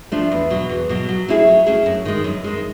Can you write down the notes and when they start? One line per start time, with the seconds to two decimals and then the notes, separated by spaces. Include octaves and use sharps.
0.12 F3 A3 D4
0.32 E2
0.50 B2 F#3
0.69 E2
0.89 B2 F#3
1.09 F#3
1.28 A3 C#4 E4 G#4
1.47 F#3
1.66 A3 C#4 E4 G#4
1.86 F#2
2.05 D#3 G#3
2.24 F#2
2.44 D#3 G#3